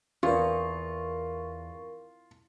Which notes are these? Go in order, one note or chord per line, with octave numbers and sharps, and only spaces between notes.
E2 F4 A#4 C#6